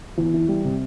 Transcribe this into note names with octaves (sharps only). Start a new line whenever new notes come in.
E2
E3
G3
C3